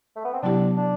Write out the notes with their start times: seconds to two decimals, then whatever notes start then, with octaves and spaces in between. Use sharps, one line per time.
0.16 A3
0.25 B3
0.33 C4
0.42 C3 F#3 B3 D4 E4 G4
0.77 D4